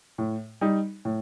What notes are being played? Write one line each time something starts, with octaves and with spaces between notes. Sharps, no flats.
A2
G3 D#4
A2